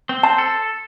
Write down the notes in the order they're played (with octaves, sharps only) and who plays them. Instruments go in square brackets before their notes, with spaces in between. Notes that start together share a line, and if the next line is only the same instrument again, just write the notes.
[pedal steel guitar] C4
[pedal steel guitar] C5 [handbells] A5
[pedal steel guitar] A4